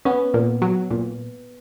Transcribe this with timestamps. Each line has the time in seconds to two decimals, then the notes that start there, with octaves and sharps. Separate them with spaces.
0.05 B3 C#4
0.34 A#2
0.62 F#3
0.91 A#2